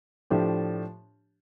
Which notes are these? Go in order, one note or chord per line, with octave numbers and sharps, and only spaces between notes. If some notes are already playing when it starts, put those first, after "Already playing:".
A2 F3 A3 D4 G4